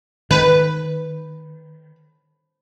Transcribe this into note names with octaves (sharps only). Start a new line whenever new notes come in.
D#3 B4